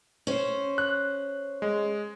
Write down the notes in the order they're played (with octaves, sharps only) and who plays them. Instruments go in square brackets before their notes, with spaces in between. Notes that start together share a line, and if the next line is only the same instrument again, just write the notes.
[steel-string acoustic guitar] C#4 C5
[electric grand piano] F#6
G#3